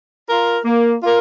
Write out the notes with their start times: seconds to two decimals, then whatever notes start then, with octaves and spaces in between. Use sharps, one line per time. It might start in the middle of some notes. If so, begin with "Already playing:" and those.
0.28 F4 A#4
0.64 A#3
1.03 F4 A#4